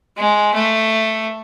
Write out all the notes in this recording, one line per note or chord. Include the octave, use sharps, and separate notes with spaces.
G#3
A3